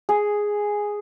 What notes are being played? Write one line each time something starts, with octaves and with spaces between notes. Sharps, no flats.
G#4